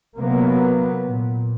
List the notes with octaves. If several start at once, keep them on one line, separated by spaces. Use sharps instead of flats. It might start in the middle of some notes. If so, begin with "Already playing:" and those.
C3 F#3 A#3 B3
A#2